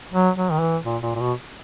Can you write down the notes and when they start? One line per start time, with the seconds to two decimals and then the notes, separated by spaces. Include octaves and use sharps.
0.13 F#3
0.37 F#3
0.52 D#3
0.61 E3
0.85 A#2
1.03 A#2
1.15 A#2
1.20 B2